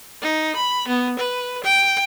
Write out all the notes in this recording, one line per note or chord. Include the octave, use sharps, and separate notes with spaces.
D#4
B5
B3
B4
G5